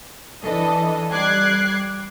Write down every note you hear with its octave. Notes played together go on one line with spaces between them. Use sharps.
E3 D4 A4 D#5
G3 D6 F#6 G#6 C7